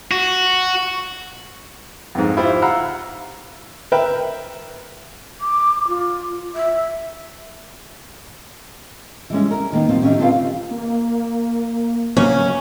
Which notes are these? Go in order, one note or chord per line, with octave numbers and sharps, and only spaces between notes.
F#4
F2 G#2
E4 F4 G4 C5
F5 F#5 A#5 B5 E6
A#4 B4 E5 G5
D6
F4
E5
E3 G3 G#3 C#4
A#4
D#3 A#3 B3 D#4
F3 F#3 C4
D#3 E3 C#4 G4
D3 C4 F4 G4 B4 F5
A#3
C#3 F#3 A#3 C#4